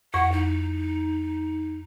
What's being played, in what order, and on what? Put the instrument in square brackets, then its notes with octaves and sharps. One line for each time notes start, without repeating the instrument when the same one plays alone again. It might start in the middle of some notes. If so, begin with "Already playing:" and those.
[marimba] F2 C#6 [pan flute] F#5
[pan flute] D#4